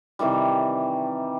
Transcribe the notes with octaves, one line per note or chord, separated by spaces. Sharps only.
C3 D#3 E3 G3